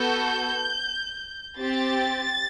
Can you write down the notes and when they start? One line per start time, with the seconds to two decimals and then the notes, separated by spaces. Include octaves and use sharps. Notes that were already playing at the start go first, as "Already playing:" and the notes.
Already playing: B3 F#4 A4 G6
1.60 C4 G4 A6